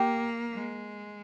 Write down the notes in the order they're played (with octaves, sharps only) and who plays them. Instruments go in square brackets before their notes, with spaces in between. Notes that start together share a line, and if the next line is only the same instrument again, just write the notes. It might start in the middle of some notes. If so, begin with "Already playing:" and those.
Already playing: [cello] A#3 [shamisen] G4
[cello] G#3